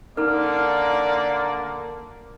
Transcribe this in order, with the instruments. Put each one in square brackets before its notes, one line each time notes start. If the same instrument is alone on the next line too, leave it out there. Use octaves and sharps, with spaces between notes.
[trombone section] D3 A#3 [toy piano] C#4 D#4 A4 [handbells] A#4 [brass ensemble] D5